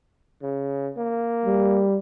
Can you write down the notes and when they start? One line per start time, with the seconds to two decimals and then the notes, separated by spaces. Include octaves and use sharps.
0.43 C#3
0.97 A#3
1.45 G3